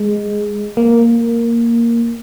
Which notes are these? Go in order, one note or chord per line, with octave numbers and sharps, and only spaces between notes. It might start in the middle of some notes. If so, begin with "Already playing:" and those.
Already playing: G#3
A#3